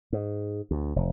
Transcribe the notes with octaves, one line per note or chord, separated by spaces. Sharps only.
G#2
D2
F1